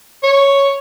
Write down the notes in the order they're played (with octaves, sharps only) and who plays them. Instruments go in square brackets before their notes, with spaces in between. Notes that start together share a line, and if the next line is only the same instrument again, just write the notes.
[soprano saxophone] C#5